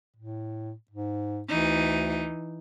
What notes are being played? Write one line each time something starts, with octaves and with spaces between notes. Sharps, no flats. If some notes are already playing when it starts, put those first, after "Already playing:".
A2
G#2
D2 E3 D#4